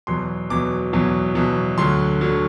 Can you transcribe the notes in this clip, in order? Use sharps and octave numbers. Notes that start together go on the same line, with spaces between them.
E2 B2 F#3 C6
E2 B2 F#3 D6
E2 B2 F#3
E2 B2 F#3
D2 D3 F#3 C6
D3 F#3